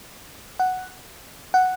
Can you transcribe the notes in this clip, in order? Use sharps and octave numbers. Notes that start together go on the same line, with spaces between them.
F#5
F#5